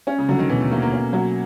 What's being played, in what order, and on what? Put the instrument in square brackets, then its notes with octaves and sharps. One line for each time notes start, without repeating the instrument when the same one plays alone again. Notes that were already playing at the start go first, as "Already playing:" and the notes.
[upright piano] C#4
[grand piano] C#3
[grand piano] D3 [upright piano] F#3
[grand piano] D#3
[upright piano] B2 [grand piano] E3
[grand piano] A3
[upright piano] A3 [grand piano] A#3
[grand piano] A#3
[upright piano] C#4
F#3